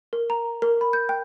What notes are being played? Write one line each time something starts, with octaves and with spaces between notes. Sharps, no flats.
A#4
A#5
A#4
B5
G6
G5